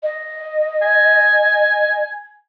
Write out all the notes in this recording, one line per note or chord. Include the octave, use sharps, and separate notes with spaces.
D#5
G#5